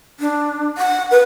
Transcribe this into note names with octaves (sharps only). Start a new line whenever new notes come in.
D4
F#5
B4